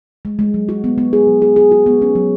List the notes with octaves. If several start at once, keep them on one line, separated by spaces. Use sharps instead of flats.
G#3
G#3
F#3
F#4
B3
B3
G#4
F#3
G#4
G#4
F#4
B3
C#4
F#3